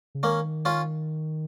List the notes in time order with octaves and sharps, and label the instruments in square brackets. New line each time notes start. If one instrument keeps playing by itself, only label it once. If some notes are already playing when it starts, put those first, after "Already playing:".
[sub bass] C#3
[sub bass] D#3 [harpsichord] A#3 C#4
[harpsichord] C#4 F4